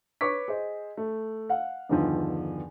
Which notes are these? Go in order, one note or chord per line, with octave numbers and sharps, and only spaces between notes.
B4 C#5 C#6 D6 B6
G#4 C5 D#5
A3
F5 F#5
E2 G2 D3 D#3 F3